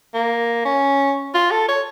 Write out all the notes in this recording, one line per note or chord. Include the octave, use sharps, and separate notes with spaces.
A#3
C#4
F4
A4
C#5